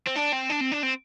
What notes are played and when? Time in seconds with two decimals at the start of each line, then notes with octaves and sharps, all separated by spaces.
0.07 C4
0.16 D4
0.33 C4
0.50 D4
0.61 C4
0.72 D4
0.83 C4